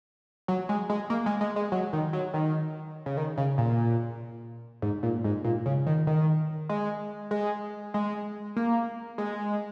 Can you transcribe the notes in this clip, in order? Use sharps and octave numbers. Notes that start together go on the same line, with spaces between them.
F#3
G#3
G#3
A#3
G#3
G#3
G#3
F#3
D#3
F#3
D#3
C#3
D#3
C#3
A#2
G#2
A#2
G#2
A#2
C#3
D#3
D#3
G#3
G#3
G#3
A#3
G#3